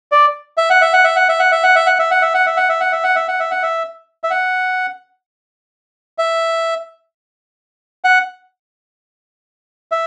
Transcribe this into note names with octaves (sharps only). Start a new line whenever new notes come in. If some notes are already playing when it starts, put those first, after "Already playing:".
D5
E5
F#5
E5
F#5
E5
F#5
E5
F#5
E5
F#5
E5
F#5
E5
F#5
E5
F#5
E5
F#5
E5
F#5
E5
F#5
E5
F#5
E5
F#5
E5
E5
F#5
E5
F#5
E5